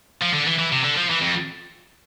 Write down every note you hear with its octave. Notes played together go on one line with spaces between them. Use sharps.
F3
D3
E3
E3
C3
D3
F3
E3
F2